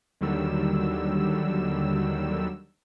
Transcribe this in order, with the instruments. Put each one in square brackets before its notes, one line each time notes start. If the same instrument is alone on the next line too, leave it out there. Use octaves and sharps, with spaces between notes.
[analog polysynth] D#2 D3 D#3 F#3 G3 E6